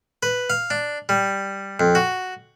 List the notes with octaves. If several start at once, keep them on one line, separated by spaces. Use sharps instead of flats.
B4
F5
D4
G3
F2
F#4